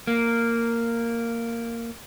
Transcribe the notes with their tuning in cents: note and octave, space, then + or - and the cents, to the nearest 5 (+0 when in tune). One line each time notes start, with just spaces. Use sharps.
A#3 -10